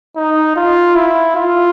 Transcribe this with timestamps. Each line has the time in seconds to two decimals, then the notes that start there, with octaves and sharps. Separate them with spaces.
0.16 D#4
0.56 F4
0.96 E4
1.36 F4